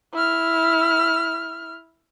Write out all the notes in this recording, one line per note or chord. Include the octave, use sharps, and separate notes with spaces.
E4 F6